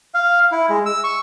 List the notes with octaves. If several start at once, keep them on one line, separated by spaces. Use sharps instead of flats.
F5
E4
G#3
E6
C#6